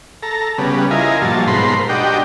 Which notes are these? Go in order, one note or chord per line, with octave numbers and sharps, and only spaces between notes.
A4 A#5
C#3 G3 B3
E4 F4 A#4 D#5 G#5
G2 A#2 F3 F#3 A5
G#2 B2 A#4 C5 B5 C6
D4 F#4 G4 D#5 G5